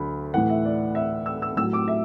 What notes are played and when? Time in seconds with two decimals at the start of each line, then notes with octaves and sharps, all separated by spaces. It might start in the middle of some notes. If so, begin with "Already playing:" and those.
Already playing: D2 D3 F#3 B5
0.34 A2 E3 F#5
0.50 E5
0.65 D5
0.95 E5
1.26 E6
1.42 E6
1.57 A2 F#3 E6
1.73 D6
1.88 E5